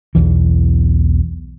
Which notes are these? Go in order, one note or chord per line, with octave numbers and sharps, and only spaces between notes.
B1 E2 E3